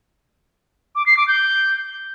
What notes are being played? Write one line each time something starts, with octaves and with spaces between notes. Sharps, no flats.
D6
C7
D6
G6